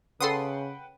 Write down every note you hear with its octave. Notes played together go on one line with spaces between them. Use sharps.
C#3 A4 B4 F#5 G5 C6 D#6